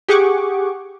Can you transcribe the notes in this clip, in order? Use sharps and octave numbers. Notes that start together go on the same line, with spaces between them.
G4 G#4 F#5 C#6 D6